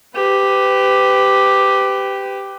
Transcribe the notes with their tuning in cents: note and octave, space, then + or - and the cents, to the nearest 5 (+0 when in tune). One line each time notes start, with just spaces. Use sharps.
G4 +0 B4 +35